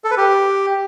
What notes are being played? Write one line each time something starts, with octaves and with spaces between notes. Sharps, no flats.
A4
B4
G4